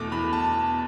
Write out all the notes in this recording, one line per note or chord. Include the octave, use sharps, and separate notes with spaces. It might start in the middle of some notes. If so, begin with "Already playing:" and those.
Already playing: E2 B2 A3 D6
E2 B5
A5